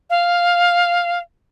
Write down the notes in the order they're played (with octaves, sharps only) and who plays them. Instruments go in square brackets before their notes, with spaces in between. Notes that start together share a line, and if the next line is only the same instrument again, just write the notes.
[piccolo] F5